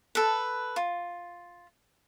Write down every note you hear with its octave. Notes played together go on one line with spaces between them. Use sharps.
A4 B4
F4